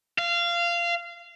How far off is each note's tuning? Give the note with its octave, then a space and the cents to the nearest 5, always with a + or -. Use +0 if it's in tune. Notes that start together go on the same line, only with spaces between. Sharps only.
F5 -20